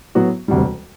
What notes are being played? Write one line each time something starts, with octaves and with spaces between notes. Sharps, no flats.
A2 F#3 B3 F#4
E1 D2 C3 G3